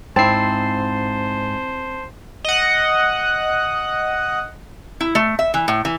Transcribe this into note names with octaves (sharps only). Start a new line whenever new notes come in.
G#2 C4 E4 C5 A5 C7
D#5 F#5
E4
A3
E5
E3
A2
E3